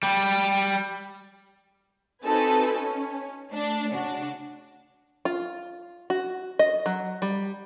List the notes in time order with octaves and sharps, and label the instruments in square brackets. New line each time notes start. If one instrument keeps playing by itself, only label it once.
[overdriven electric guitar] G3
[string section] C4 D#4 F#4 A4 B4 G#5
C#4
A3 D4
C#3 D4 F#4
[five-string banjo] F4
F#4
D#5
F#3
G3